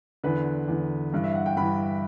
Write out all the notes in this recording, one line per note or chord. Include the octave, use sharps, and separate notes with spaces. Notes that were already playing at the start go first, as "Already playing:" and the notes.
E2 D3 B4
E2 D3
G2 E3
E5
F#5
G5
G2 E3 B5